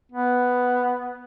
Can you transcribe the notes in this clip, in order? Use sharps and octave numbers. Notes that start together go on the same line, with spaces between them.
B3